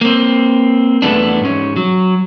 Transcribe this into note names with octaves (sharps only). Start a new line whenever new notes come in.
A#3 C4
E2 E3 A3 B3 D4
G#2 C#4
F#3